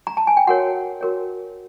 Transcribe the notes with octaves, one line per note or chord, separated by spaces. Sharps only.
A#5
A5
G#5
G5
F#4 A#4 C#5 F#5
F#4 A#4 C#5